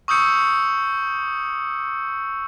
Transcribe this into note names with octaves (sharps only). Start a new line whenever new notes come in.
C#6 D#6 E6 G6 C#7